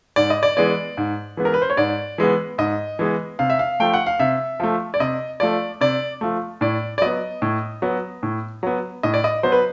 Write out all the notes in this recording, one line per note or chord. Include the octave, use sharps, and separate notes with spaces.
G#2 D5
D#5
D5
E3 G#3 B3 D5
G#2
E3 G#3 B3
A#4
B4
C5
C#5
G#2 D5
E3 G#3 B3
G#2 D#5
E3 G#3 B3
C3 F5
E5
F5
F3 A3 G5
F#5
F5
C3 E5
F3 A3
D5
C3 D#5
F3 A3 D5
C3 D5
F3 A3
A2 D5
D5
F#3 B3 D#5
A2
F#3 B3
A2
F#3 B3
A2 D#5
D5
D#5
F#3 B3 C5
B4